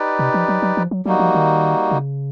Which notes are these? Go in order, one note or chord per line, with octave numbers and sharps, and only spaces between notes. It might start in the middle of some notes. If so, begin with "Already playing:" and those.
Already playing: D#4 G4 B4 D5
C3
F3
F#3
F#3
F3
F#3
F#3 G3 A#3 D#4 F#4
F3
D#3
C#3